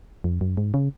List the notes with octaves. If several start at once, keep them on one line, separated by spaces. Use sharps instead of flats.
F2
F#2
G#2
C#3